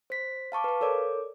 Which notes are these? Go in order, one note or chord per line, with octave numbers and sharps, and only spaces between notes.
C5 B6
F5 A5 C#6 D6
B4 F5
A4 A#4 C#5 D5 D6